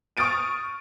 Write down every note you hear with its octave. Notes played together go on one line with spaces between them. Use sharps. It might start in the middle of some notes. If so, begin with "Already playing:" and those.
C#6 D#6 F6 A6 D7 D#7